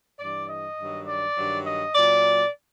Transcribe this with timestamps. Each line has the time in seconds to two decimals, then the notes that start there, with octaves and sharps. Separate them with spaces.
0.19 G2 E3 D5
0.49 D#5
0.78 G2 D#3 F#3
1.07 D5
1.36 G2 D#3 F#3
1.66 D#5
1.95 A#2 F#3 D5